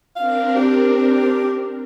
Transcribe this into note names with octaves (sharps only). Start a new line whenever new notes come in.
C4 D4 A#4 F5
G4